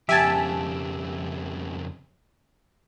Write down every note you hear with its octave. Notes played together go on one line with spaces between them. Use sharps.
F2 C#3 G4 E5 G#5 A5